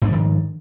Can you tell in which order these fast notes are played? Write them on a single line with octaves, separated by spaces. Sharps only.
G#2 D4 F3 D#3